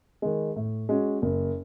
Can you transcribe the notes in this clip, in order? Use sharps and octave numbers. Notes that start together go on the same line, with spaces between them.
D#3 G#3
A2
G#3 C#4 F#4
F#1